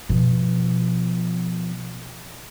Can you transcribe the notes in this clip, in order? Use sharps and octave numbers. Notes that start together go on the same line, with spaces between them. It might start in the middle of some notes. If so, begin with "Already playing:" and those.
B2 F3